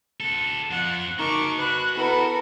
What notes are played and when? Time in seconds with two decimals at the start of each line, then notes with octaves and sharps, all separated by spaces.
0.20 F#4 A4
0.71 F2 F3 F#5
1.19 D#4 F#4 A#4 D#5 A5 C#6 D6
1.58 B4 B5 F#6
1.95 B3 E4 A4 A#4